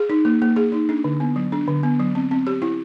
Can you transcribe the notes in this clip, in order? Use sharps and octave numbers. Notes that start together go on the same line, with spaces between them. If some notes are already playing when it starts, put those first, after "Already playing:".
Already playing: G#4
D#4
A#3
A#3
G#4
D#4
D4
D3
B3
F#3
D4
D3
B3
F#3
C4
C4
G4
E4